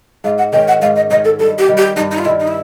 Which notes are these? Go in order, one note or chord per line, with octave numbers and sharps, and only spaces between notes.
G#2 F5
F#5
D#3 G#3 C#4 G5
F#5
G#2 F5
D#5
D#3 G#3 C#4 D#5
A4
G2 A4
G4
D#3 G3
G4
G2 D#4
D#4
F4
D#3 G3 E4
D#4
E4